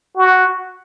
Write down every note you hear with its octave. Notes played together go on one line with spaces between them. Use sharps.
F#4